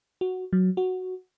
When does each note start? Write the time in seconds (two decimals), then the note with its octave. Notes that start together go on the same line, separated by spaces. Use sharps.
0.21 F#4
0.53 F#3
0.77 F#4